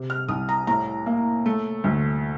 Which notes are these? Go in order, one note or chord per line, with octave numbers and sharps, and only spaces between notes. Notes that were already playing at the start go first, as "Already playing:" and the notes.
Already playing: C3
F6
C2 D#6
A#5
A2 A#5
A#3
A3
D2